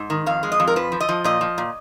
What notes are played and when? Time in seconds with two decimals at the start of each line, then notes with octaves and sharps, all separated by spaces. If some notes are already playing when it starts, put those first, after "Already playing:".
Already playing: G#2
0.10 D#3
0.26 F2 F5
0.43 G#3
0.52 D#5
0.60 F2
0.67 A#4
0.76 F3 B4
0.92 F3
1.01 D#5
1.09 F3
1.24 A#2 D#5
1.41 F3
1.58 A#2